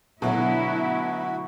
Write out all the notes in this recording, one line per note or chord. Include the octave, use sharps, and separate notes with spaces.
B2 D3 F#3 A3 E4 F#4